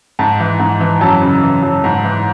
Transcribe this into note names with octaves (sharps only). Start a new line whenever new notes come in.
G#2 A5
E3
G#2
E3
F#2 A5
C#3
E3
F#2
G#2
E3